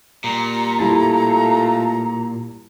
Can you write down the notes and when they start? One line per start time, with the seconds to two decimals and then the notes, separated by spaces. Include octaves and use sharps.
0.24 A#2 G3 A#5
0.79 G3 A3 E4 F4 A5